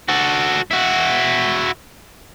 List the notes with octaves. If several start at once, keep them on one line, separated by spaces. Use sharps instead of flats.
F#4 A4
E4 F#4